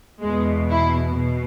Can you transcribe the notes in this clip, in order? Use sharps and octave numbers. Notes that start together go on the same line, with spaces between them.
E2 B2 G#3
E4
B2